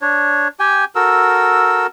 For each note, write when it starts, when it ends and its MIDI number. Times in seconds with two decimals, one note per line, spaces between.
0.02 0.48 62
0.02 0.48 73
0.60 0.85 67
0.60 0.85 79
0.60 0.85 80
0.95 1.87 66
0.95 1.87 69
0.95 1.87 70
0.95 1.87 88